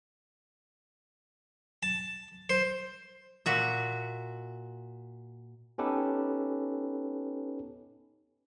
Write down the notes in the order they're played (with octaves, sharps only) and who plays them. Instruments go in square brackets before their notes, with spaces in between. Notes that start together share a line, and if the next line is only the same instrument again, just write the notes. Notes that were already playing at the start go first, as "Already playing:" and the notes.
[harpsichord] A5
C5
[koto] A#2 F#4 E5
[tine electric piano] B3 C#4 D#4 G4 A4 B4